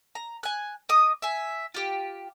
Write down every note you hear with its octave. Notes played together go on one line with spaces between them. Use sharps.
A#5
G#5 F#6
D#5 D6 D#6
E5 G#5
F4 G4